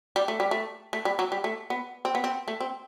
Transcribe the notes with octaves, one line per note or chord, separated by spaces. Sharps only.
G3
A3
G3
A3
A3
G3
F#3
G3
A3
B3
C4
B3
C4
A3
C4